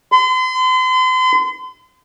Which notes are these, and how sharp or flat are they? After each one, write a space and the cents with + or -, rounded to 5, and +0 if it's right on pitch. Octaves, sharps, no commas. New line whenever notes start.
C6 -40